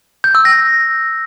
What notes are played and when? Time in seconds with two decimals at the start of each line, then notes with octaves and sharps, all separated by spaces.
0.24 G6
0.35 E6
0.45 A#6